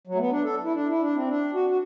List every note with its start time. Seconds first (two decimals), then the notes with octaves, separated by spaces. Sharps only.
0.07 F#3
0.15 A3
0.19 B3
0.32 D4
0.44 A4
0.64 E4
0.73 D4
0.88 E4
1.02 D4
1.16 C4
1.28 D4
1.54 F#4
1.70 F#4